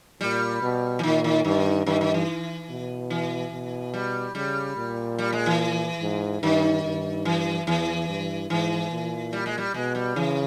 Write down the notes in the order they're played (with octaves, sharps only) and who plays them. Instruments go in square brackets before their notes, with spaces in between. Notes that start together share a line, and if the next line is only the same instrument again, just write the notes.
[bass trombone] A#2 [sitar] G3
[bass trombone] B2
[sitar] E3
[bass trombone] A#2 [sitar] D#3
[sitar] D#3
[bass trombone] G2 [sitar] D#3
[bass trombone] G2 [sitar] D#3
[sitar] D#3
E3
[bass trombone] B2
[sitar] E3
[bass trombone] B2
[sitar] G3
[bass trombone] C#3 [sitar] G3
[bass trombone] A#2
[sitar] G3
G#3
E3
[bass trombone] G#2
[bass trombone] G2 [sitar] D#3
[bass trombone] G2
[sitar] E3
[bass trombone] E2 [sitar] E3
[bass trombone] G2
[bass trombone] G#2 [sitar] E3
[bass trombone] A#2
[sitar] G3
G#3
G3
[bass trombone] B2 [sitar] G#3
[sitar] G3
[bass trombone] C#3 [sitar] E3